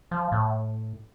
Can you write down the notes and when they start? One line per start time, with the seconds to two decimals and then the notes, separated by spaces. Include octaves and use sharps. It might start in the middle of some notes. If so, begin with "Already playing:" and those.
0.11 F3
0.32 A2